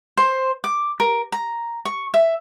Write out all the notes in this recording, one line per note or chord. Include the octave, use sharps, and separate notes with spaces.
C5
D6
A#4
A#5
C#6
E5